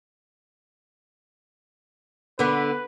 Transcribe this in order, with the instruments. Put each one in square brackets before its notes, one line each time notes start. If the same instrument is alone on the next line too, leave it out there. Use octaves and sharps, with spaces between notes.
[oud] D3 B3 [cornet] B4